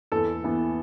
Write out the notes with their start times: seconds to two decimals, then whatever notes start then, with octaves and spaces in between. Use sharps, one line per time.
0.12 E2 A4
0.44 E3 B3